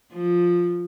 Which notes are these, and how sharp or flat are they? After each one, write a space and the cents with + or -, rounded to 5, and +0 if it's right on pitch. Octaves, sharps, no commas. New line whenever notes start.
F3 +5